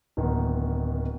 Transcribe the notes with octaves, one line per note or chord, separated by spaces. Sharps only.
D1 D#3 A#3 B3